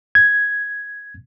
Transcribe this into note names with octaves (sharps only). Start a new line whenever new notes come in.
G#6